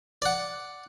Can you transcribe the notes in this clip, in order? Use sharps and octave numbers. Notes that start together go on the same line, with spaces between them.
D5 F#5